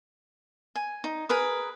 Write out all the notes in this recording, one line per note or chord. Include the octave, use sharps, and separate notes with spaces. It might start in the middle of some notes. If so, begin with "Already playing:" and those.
G#5
D#4
G#4 A#4 B4 D#6